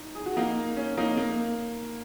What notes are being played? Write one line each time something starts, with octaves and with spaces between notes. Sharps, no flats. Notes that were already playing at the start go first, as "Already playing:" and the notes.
Already playing: D#4
G#4
F#4
A#3 D#4
C#4
A#3 D#4
A#3